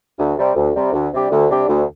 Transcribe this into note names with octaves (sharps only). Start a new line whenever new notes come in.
D2
C3 G3
D2
C3 G3
D2
C3 G3 D4 G4
D2
C3 G3 D4 G4
D2